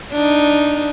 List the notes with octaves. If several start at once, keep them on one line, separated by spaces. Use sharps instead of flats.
D4 D#4